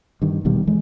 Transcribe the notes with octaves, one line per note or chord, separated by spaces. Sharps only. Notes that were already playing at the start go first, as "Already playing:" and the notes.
G2 D#3
D#1 B2 D#3 G3
E3 G#3 A3